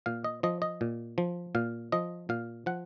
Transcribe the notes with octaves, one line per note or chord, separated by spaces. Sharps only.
A#2 F5
D#5
F3 D#5
D#5
A#2
F3
A#2 F5
F3 D#5
A#2 F5
F3 F#5